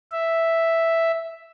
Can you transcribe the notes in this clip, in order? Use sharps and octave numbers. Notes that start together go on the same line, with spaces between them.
E5